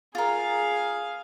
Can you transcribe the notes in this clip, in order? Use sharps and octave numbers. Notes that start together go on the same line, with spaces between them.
F4 G#4 A#4 F5